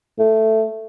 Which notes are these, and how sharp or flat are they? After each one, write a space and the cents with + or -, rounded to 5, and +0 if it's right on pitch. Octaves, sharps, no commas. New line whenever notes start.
A3 +5